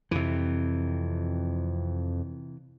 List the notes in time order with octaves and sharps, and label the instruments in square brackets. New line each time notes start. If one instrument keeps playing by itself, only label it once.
[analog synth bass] F2 [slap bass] C3 E3